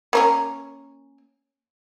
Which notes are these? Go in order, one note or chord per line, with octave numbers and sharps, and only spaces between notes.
A#3 C#4 A#4